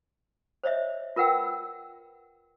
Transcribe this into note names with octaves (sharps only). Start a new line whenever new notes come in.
C5 C#5 D#5 E5
F4 A#4 B4 F#5 G5 E6